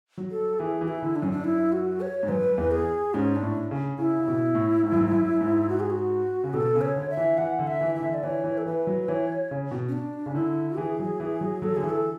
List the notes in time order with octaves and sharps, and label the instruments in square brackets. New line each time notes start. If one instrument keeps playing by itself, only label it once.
[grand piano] F#3
[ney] A4
[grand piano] E3 [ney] G#4
[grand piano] E3
[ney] E4
[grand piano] D3
[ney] D4
[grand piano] F#2 [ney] C#4
[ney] D4
E4
F#4
C#5
[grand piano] G#2
[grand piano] F#2 [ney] B4
[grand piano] E2
[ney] G#4
[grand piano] G#2 [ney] C#4
[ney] D4
[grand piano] A2
C#3
[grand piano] C#3 [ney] E4
[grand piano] C#3
B2
A2
G#2
F#2
G#2
F#2
G#2
[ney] F#4
G#4
F#4
[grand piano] C#3
[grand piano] B2 [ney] A4
[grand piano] C#3
[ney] C#5
[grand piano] D3
[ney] E5
[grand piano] E3
[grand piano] E3 [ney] F#5
[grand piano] D3
[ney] E5
[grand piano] E3
[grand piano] E3 [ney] E5
[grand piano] D3
[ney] D5
[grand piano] E3 [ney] C#5
[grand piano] E3
[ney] A4
[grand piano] E3 [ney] B4
[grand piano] F#3
[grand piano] E3 [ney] C#5
[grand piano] C#3
B2
[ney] C#4
D4
[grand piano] C#3
[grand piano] D3 [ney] E4
[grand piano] E3 [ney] G#4
[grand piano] F#3
E3
F#3
[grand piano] F#3 [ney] A4
[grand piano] D3 [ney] G#4
[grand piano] E3
[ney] A4